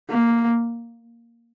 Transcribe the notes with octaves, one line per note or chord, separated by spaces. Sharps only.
A#3